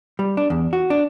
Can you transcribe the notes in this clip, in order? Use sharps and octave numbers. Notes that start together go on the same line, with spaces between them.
G3
D4
E2
F#4
D4